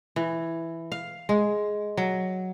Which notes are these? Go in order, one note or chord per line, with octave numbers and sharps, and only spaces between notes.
E3
F5
G#3
F#3